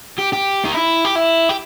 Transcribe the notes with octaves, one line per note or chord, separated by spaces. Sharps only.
G4
G4
D#4
E4
G4
E4
G4